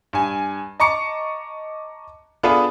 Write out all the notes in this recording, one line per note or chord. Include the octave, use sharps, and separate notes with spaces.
G2 G#5
D#5 A5 A#5 C#6 D6 C#7
B3 D4 F4 G#4 A4 B4